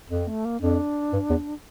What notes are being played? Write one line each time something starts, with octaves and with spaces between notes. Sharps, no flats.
F2 C4
A3
A#3
F2 D4
G2
E2